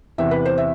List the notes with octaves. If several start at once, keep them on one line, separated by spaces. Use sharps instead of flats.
E2 C3 E3 E5
B4
C5
E5